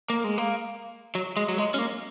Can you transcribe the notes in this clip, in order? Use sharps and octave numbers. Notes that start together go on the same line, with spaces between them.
A#3
G#3
A#3
F#3
G#3
F#3
G#3
C#4
A#3